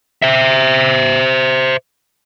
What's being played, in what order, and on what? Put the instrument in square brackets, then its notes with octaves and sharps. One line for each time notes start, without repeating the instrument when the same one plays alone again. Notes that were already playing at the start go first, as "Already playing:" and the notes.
[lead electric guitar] C5 E5